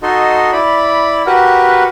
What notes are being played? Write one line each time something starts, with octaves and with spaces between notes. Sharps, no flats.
D#4 F#4 A4 D#5 C6
E4 D5 B5
F#4 G4 A#4 B4 F#5